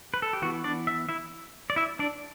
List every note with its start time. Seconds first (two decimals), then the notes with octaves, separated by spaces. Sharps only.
0.14 B4
0.22 A4
0.33 G4
0.42 E3 B3 F#4
0.64 D4 D5
0.87 E5
1.09 E4 E5
1.70 D5
1.76 E4 E5
1.99 D4 D5